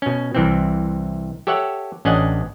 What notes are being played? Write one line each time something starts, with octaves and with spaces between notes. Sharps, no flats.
B2 C#4
C2 E3 C4
G4 A4 C#5 E5 F#5
A1 C#4 D4 D#5 F#5